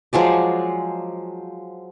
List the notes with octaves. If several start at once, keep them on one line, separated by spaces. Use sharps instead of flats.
F3 F#3 G#3 D5